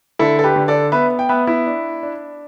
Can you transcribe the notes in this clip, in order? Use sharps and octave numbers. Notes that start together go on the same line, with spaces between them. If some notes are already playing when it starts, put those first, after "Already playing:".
D3 E4 A4
A4
G4 B4
D3
A4 D5
B3 B4 E5
G5
B3 B4 E5
E4
D4
D4